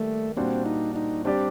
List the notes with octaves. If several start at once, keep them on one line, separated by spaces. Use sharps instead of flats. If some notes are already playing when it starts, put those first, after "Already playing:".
Already playing: D#3 G3 A3 A#3
A#2 G3 C4 D4 F#4 C5
D#4
D#4
G3 C4 D4 G4 D5